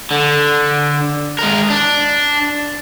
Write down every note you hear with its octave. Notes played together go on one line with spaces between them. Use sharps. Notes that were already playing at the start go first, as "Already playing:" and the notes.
D3
G#3 A#4
D4